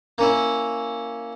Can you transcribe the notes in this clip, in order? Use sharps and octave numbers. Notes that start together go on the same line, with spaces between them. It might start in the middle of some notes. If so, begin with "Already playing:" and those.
A#3 C#4 E4